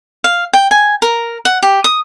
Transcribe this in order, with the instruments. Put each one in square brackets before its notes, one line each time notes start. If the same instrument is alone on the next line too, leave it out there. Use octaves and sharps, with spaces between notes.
[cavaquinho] F5
G5
G#5
A#4
F#5
G4
D#6